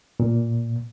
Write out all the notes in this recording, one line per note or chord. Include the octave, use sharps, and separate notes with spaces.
A#2